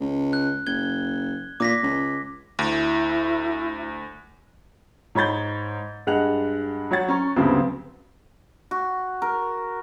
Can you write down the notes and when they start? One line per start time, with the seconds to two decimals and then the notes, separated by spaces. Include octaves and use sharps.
0.01 C#2
0.33 F#6
0.66 F#1 G#6 G7
1.60 A#2 D6 A#6 B6
1.83 C#2
2.59 D2 E4
5.15 G#2 C#5 B5 G6 A6 G7
6.07 G2 G#3 F#5 F#6 F7
6.91 F#3 C#5 F#5 A6
7.08 C#4 A#5 C#6
7.36 D2 G2 C#3 F#3 B3 C4
8.71 F#4
9.22 A#4